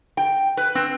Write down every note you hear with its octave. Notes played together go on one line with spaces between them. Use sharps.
G5
B4
C4